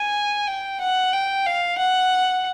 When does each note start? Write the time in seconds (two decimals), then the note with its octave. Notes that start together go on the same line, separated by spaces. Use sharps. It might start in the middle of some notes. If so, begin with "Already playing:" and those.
Already playing: G#5
0.47 G5
0.80 F#5
1.13 G5
1.46 F5
1.78 F#5